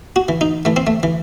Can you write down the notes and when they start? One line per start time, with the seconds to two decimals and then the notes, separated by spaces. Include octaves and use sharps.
0.16 F#4
0.29 E3
0.41 D#4
0.65 E3 A3
0.76 C4
0.87 A3
1.03 E3